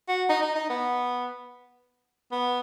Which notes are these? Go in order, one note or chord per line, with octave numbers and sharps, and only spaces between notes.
F#4
D#4
D#4
D#4
B3
B3